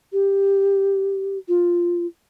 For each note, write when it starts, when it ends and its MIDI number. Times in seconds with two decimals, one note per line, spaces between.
0.13 1.38 67
1.48 2.06 65